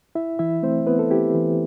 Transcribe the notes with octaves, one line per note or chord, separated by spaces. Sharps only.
E4 E5
E3 E4 E5
A3 C4 C5
B3 E4 B4
A4
E4 G4
E3